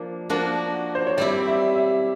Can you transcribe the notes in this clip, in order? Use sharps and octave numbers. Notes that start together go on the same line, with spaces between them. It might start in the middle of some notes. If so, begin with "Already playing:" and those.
Already playing: F3 A#3 D4
F3 A#3 D4 F#4
C5
C#5
G3 C4 E4 D5
E5
E5